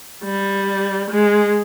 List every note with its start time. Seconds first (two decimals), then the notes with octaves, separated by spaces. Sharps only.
0.24 G3
1.10 G#3